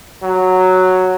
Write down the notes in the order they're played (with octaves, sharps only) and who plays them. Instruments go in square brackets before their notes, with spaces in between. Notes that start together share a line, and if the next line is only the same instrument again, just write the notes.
[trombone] F#3